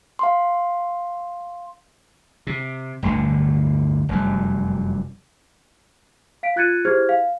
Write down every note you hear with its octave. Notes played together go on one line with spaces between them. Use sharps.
F5 C6
C3
G1 D2 A2 D3
F1 F#2 G3
F5 B6 D7
F4 F#6 G#6 A6 C#7 D#7
E4 G4 G#4 C5 F6 G#6
F5